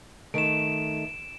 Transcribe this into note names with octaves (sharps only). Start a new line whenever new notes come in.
D#3 A3 D7 E7